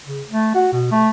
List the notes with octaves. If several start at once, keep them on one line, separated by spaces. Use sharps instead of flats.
C#3
A3
F#4
B2
A3